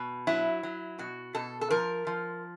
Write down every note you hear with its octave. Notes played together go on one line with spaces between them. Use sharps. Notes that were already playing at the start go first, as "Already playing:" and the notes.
Already playing: B2
F#3 E4
F#3
B2 F#4
B2 A4
A4
F3 A#4
F3